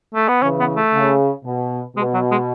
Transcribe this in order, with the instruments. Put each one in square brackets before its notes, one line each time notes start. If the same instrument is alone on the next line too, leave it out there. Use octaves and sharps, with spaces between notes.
[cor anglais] A3
B3
[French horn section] C#3 E3 [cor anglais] C#4
[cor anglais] B3
A3
[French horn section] C#3
B2
[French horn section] B2 [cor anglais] G#3
[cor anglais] F#3
G#3